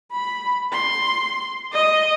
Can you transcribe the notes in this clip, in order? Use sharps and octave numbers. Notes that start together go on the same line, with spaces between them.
B5
C6
D#5